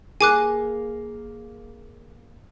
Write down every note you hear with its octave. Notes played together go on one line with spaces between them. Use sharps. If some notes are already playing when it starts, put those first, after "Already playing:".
A#3 G#4 G#5 D6 F#6